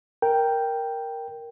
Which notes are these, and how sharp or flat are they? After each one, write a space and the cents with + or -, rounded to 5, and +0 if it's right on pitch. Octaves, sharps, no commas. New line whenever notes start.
A#4 +0 G5 +0